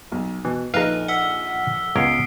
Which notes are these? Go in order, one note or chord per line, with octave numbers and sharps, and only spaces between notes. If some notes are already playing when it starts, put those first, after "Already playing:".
B1
B2 E3
A#1 D#4 A4 B4 F5 A#5 F6
F#5 E6 B6 G7
C#2 B3 A#4 C#5 C7 D7